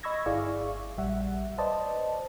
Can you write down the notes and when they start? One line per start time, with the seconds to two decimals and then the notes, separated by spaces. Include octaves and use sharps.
0.03 D#5 B5 C#6 E6 G#6 A#6
0.26 G1 E4 G#4 D5 F5 C#6
0.98 A#1 G3 E5 F#5
1.58 B4 C5 D5 D#5 A5